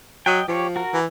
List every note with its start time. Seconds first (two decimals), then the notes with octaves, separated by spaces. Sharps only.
0.26 F#3 D#5 G5
0.48 F3 G4 C#5
0.76 F#4 A#4
0.94 E3